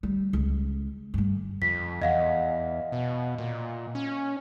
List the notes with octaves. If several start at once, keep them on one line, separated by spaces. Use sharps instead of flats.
G3
C#2
G2 D3
F2 B6
E2 D#5 F5 F#5
B2
A#2
C#4